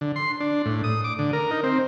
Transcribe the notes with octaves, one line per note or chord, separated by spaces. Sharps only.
D3
C6
D4
A2
D#6
D6
D3
A#4
D#4
C4